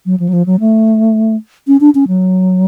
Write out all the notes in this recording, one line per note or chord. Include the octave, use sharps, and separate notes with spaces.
F#3
F3
F#3
F3
F#3
A3
C#4
D4
C#4
F#3